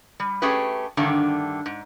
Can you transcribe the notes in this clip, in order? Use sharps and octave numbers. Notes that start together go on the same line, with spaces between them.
G3
A3 C#4 G4 G#4 B4
G2 D3 D#3 A3
G#2